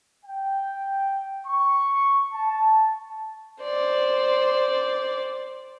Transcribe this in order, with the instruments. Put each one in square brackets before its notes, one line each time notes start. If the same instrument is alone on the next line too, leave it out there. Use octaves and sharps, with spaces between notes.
[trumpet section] G5
C#6
A5
[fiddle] C5 D5